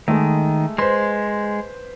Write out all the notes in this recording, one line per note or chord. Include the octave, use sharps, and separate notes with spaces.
D#3 G#3 A3
G#3 B4 C5 C6